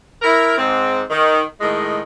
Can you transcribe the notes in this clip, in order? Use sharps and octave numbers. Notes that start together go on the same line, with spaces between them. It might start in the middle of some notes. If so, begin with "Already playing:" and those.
E4 A#4
G#2 C4
D#3
A2 D#3 G#3